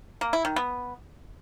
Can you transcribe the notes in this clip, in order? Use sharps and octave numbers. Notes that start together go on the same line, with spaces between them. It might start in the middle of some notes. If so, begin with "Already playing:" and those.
A#3
E4
D#3
B3